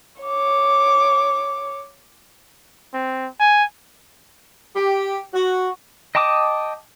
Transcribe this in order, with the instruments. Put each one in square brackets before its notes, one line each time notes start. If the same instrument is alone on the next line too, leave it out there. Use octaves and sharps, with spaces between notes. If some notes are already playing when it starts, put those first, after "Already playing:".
[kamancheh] C#5 D6
[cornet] C4
G#5
[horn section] G4
F#4
[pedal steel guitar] D#5 G5 A5 D6 D#6